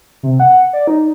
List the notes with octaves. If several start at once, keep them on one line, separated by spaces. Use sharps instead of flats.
C3
F#5
D5
D#4